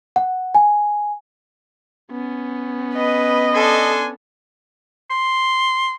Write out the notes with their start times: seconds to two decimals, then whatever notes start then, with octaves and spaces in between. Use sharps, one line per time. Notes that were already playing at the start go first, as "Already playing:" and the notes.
0.16 F#5
0.55 G#5
2.11 B3 C#4
2.94 B4 D#5
3.54 D4 A4 G#5 C6
5.10 C6